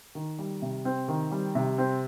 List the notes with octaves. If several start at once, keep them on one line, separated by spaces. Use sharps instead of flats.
D#3
G3
C3
C4
D#3
G3
C3
C4